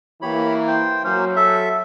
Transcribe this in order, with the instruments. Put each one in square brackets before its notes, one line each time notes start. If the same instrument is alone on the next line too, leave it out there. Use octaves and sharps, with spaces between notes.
[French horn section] E3 A#3 [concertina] G4 C#5 B5
[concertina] C5 G5
[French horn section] F#3 [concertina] A#3 C#4 C5
[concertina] A4 E5